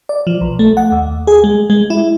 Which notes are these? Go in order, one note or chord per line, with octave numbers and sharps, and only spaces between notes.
D5
F3
B1
A3
F#5
D#2
G#4
G#3
G#3
E4